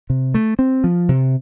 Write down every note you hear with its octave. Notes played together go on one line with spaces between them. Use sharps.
C3
A3
C4
F3
C3